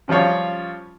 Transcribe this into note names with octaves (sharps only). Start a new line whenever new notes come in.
C#3 F3 G3 F4 C#5